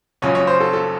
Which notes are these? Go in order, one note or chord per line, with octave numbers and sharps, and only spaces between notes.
F#1 F#2 C#3 F3 C#5
C#5
C5
A4
A4